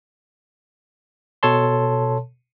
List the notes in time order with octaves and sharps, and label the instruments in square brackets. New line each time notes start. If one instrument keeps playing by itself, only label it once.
[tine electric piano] B2 A4 C#5 A5 C6